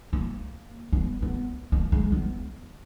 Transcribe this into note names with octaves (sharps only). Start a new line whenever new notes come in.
A#3
B3
B3
A#3
G#3
B3